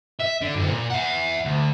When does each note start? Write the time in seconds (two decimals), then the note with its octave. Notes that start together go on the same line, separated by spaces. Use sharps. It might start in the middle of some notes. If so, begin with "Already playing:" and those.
0.20 E5
0.41 D3
0.55 F#2 D3
0.68 A#2
0.90 E5 F#5
1.45 D2